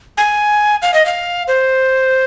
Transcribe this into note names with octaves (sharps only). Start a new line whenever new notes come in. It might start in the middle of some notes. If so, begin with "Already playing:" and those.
G#5
F5
D#5
F5
C5